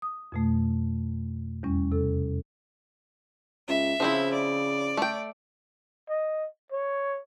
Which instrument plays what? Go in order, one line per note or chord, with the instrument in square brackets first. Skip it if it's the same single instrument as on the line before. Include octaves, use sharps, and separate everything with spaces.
[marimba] D#6
F2 B2 A3
E2 G3 C#4
C3 A4
[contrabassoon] C#2 [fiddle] E5
[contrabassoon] C#3 [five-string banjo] F3 C4 E4
[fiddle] D5
[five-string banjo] A3 G5
[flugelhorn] D#5
C#5